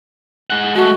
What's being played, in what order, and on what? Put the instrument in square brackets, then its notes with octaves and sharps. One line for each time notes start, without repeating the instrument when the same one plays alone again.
[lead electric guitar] G#3 F#5
[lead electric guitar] G#3 A3 [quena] F#4